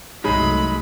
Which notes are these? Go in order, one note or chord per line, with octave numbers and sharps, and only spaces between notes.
C2 F#2 F#3 G#3 A3 D#4 B5